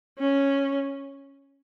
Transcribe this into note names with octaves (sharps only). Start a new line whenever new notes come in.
C#4